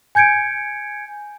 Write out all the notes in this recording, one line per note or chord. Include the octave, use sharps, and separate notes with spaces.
G#5 G6 G#6 C#7 D7